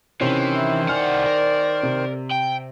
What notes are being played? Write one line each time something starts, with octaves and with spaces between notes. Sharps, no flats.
C3 D#3 E3 C#4 C5 C7
E4
C2 D5 F#5 G#5 F6
A#4
C3
G5